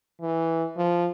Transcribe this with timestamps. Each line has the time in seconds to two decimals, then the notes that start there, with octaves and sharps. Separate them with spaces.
0.21 E3
0.77 F3